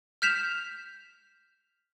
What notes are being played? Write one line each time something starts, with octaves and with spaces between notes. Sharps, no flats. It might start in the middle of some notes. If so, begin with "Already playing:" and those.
F6 G6 B6 E7 F7